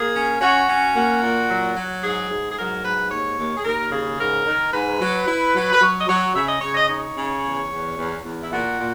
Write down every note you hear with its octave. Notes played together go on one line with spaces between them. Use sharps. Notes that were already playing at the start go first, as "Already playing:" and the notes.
Already playing: A#3 G#4
C#4
C#4 F#4
C#4
A#3 F#4
A#2
F#3
F#3
G#2 G#4
G#2
G#4
F#3 A#4
G#2 B4
D#2 C#5
D#2
G#4
D#2 A#4
C#3 G#4
G#2 A#4
D#3
G#2 B4
F#3
E4
F#3
B4
F#3 C#5
D#5
F#3 C#5
C#3 E5
D#5
C#3 C#5
D#5
D#4 C#5
C#3
E2
E2
E2
E2
E4
A#2 F#4
A#2